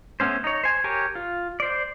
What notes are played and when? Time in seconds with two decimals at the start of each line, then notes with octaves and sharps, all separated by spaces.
0.20 A3 B3 C#4 C5
0.44 D#4 C#5
0.64 C5 G#5
0.84 G4 A#4 C#5 G#5
1.15 F4
1.60 C5 D5